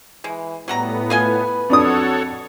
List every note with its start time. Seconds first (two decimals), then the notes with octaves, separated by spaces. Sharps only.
0.24 E3 G#3
0.68 A2 F#3 G3 B3 F#5 A#5
1.10 F4 B4 D#5 G#5
1.70 F2 D4 F#4 A4 C#5 D#6